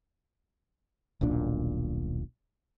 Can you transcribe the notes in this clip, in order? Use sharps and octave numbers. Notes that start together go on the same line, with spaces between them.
D#1 B1 A#2 D4